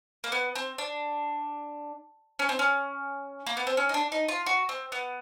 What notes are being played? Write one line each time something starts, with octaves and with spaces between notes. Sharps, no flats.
A#3
B3
C4
D4
C#4
C4
C#4
A#3
B3
C4
C#4
D#4
D4
D#4
F4
F#4
C4
B3